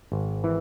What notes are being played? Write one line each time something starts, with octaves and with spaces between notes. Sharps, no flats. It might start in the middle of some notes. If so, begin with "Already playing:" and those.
G#1
E3